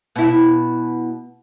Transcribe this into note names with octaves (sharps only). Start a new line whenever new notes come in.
B2 E4